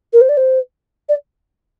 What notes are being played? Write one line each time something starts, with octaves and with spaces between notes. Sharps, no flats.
A#4
C5
D5
C5
D5